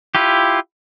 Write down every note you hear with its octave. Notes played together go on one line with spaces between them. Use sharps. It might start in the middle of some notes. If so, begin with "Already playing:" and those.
E4 F4 G4